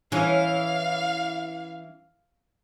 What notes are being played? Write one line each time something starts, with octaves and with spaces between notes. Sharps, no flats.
E3 C#4 F5